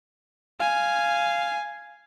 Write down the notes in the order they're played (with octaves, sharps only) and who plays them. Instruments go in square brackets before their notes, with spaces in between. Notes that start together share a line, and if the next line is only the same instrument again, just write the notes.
[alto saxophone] F5 [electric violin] G#5